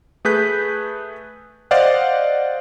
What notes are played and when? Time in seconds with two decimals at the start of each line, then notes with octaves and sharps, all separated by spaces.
0.25 A3 G#4 B4 F#6 G6 B6
1.71 C5 D5 D#5 F5 F#5